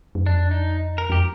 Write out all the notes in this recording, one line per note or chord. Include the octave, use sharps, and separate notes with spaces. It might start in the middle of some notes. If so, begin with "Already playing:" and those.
F#2
F2 D4
D#4
A#4
F2 G4